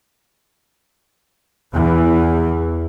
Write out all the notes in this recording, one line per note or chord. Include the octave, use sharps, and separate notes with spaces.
E2 E3